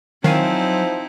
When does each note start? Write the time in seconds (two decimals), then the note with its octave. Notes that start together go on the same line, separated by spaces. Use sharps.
0.24 D#3 F3 F#3 C4 D#4 E4 F5 G#5